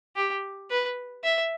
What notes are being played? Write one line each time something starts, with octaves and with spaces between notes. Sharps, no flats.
G4
B4
E5